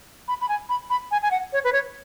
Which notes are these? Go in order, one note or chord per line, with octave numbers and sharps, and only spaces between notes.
B5
B5
G#5
B5
B5
G#5
G#5
F#5
C#5
B4
C#5